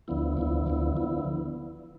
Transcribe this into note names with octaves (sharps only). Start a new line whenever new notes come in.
D2 D3 F3 B3 E4
D2 D3 F3 B3 E4
D2 D3 F3 B3 E4
D3 F3 B3 E4